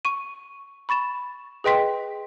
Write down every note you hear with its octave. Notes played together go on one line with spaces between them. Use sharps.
C#6 D#7
B5 C#6 A6 E7
G#4 B4 D#5 G5 C6 B6